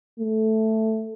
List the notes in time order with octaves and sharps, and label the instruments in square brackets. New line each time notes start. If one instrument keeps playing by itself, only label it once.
[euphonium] A3